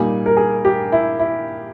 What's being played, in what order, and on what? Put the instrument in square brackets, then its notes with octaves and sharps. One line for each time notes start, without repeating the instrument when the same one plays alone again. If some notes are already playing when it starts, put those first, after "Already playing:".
Already playing: [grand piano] A#2 G3 A#3 D#4 [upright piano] G#5
[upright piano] A#4
G#4
G4
E4
E4